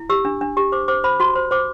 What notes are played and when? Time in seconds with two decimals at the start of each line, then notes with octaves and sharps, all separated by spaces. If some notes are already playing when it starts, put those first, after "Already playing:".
Already playing: E4
0.10 G4 E6
0.25 D4
0.41 D4
0.57 G4
0.72 C5 D6
0.88 C5 D6
1.04 C5 B5
1.20 F#4 C6
1.35 C5
1.51 C5 D6